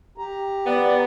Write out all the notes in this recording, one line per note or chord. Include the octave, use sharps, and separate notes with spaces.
G4 A#5
B3 D5